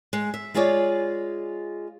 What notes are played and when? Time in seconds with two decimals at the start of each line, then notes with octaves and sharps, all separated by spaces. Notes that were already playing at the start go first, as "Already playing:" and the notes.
0.13 G#3
0.34 E5
0.54 G#3 F4 G#4 C#5 D5